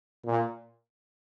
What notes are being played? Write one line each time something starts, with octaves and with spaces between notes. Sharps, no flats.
A#2